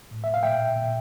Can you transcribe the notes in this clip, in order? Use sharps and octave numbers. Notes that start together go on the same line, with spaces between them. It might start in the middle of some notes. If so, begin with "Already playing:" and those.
A2
E5
F5
A#2 E5 G5
A#2